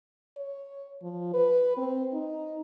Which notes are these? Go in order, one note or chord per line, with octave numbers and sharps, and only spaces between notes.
C#5
F3
B4
C4
D#4